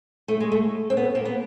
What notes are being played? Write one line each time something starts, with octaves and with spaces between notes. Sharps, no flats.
A3
G#3
A3
C4
B3
A#3
B3